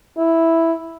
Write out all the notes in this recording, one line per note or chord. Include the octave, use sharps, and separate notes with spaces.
E4